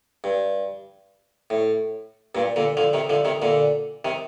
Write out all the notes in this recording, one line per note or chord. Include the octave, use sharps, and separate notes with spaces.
G2
A2
G2 A#2
A#2 D3
D3 F3
C3 D#3
D3 F3
C3 D#3
A#2 D3
C3 D#3